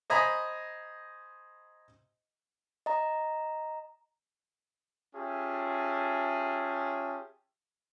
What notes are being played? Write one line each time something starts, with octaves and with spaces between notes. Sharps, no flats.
C5 D#5 G#5 A#5 B5
D#5 A#5
C#4 F4 G4 G#4 E5 A5